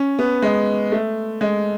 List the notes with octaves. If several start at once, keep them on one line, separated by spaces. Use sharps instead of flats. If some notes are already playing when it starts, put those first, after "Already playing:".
Already playing: C#4
B3
G#3
A3
G#3